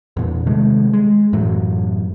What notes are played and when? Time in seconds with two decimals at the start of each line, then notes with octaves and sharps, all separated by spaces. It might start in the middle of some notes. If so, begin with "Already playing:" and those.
0.17 E2 A#2
0.46 C3 D#3 G#3 A3
0.93 G#3
1.33 F#2 A2 E3 F#3